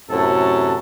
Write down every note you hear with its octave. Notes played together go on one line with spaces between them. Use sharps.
F#2 A2 C3 F#4 A4 A5